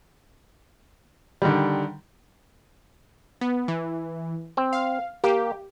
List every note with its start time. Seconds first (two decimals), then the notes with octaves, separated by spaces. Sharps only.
1.42 D3 D#3 G3
3.41 B3
3.68 E3
4.57 C4
4.73 F5
5.24 A#3 G4